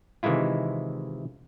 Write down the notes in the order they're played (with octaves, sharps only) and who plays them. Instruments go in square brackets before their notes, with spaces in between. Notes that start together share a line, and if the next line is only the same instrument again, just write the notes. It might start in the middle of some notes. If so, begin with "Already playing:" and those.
[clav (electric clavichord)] C3 D#3 E3 G#3 E4 F4